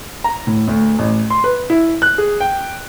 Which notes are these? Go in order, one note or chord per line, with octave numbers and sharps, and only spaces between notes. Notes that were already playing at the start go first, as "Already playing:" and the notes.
A#5
A2
D2
A1
C6
B4
E4
F#6
G#4
G5